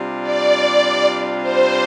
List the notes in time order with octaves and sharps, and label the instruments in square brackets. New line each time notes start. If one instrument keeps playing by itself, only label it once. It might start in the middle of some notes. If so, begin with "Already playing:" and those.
Already playing: [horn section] C3 G3 D4 F4
[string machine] D5
C5